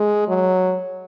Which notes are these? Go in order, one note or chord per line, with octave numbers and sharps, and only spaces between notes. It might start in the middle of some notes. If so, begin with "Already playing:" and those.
Already playing: G#3
F#3